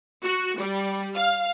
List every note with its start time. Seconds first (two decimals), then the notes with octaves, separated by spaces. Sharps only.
0.23 F#4
0.58 G3
1.15 F5